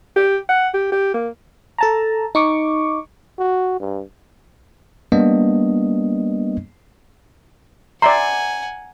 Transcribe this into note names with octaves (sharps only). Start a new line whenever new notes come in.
G4
F#5
G4
G4
A#3
A4 A5 A#5
D#4 C#6 D6
F#4
G2
G3 A#3 B3 D4 D#5
D5 E5 F#5 G#5 A#5 C6